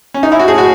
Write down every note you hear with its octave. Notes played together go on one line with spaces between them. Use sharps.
C#4
D#4
E4
F#4
A2 G#4
F#4